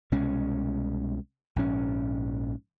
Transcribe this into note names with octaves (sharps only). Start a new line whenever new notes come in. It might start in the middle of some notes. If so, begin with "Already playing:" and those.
C2 B2 G#3 C#4
A#1 G#2 C#4